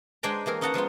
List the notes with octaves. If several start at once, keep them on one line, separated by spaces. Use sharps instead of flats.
G#3 D4 C5 G5 G#5 A#5
E3 A#3 G#4 A#4
C#4 D#4 D#5 F#5 A5 A#5
F3 G#3 B3 F4